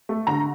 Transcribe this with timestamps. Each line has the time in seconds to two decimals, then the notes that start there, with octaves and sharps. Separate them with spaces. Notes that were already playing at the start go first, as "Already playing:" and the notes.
0.09 A3
0.27 D3 A#5